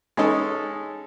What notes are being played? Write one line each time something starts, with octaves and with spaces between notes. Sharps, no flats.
G#3 C#4 D#4 A4